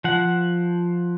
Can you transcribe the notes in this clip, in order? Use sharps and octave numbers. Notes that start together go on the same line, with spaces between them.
F3 F#5